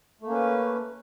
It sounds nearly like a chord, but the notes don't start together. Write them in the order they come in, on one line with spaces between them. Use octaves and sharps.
A3 A#3 C#4 B4